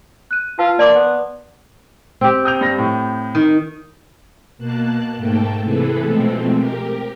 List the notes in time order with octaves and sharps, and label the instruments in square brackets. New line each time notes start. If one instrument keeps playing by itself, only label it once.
[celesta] F#6 D#7
[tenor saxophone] F4 [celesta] B4 F5 A5
[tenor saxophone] A#3 [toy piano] D5 C6 D6 [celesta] A5
[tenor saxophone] B3
[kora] C4 G4
[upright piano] D#6 G6 F7
G2 A#6
A2
[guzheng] D#3
[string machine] B2 A#3 A5 F#6
G#2 A3 A#3 G5 A5
C3 E3 G#4 A4 B4
B2 F3 G#3 A3 C4
G4 A#4